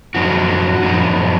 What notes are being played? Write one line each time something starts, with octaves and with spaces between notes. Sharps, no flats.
F#2 F3 B3 D#4 F#4
F#2 F3 B3 D#4